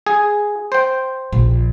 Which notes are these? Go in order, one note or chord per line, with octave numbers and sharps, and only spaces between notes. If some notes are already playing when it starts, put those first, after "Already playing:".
G#4
C5 G5
A#1